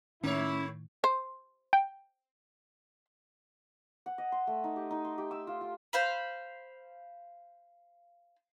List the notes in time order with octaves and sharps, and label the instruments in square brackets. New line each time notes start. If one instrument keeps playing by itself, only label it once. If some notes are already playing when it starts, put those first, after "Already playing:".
[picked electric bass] A2 D#3 [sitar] A3 C#5 [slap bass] C#4 [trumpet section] E4
[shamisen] C5
[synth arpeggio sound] G5
[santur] F#5
D#5
C6
A3
D#4
G4
D#4
C6
G4
E6
F4
F4
[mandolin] C5 F5 B5